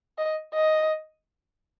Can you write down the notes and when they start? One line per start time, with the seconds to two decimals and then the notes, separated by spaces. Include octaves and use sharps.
0.18 D#5
0.54 D#5